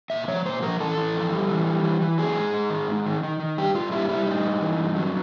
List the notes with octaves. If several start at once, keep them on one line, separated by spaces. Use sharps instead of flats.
A#2 E5
F3 C#5
A#2 C5
F3 A#4
E3 A4
E3
F2
G3
E3
G3
E3
E3
F#3 G#4
G#2
G#2
D#3
G#2
D#3
D#3
D#3
G2 G4
G2 F4
G3 E4
G3 E4
G2 D#4
G2
E3
G2
F#3